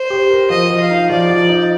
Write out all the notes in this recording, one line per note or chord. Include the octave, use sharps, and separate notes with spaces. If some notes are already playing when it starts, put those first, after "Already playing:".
Already playing: C5
G4
A#4
F3 D#5
F3
F5
D#4
F3 D5
F3
D#4